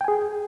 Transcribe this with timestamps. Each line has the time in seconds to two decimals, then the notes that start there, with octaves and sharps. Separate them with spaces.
0.01 G5
0.04 G#5
0.08 G#4